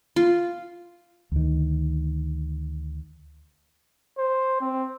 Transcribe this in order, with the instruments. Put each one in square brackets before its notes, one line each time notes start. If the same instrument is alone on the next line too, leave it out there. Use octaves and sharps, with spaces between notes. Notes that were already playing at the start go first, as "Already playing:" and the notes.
[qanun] F4
[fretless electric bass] D2 D#3
[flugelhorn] C5
C4